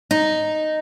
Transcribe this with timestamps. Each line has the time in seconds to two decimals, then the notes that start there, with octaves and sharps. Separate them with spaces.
0.11 D#4